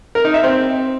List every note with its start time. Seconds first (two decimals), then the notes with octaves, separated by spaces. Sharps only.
0.15 A#4
0.25 D#4
0.34 E5
0.44 C4